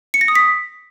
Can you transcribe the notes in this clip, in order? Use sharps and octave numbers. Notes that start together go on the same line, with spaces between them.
C#7
A#6
D#6
B6